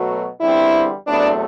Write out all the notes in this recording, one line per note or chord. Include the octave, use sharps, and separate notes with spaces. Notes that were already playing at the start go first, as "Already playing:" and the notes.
Already playing: B2 F#3 A3
E2 D3 G3 C4 E4
E2 C3 F#3 A3 B3 D4